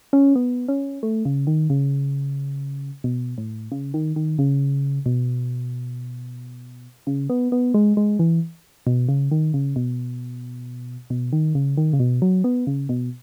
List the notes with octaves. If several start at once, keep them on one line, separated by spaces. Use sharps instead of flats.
C#4
B3
C#4
A3
C#3
D#3
C#3
B2
A2
C#3
D#3
D#3
C#3
B2
C#3
B3
B3
G#3
G#3
E3
B2
C#3
D#3
C#3
B2
B2
D#3
C#3
D#3
C#3
B2
F#3
B3
C#3
B2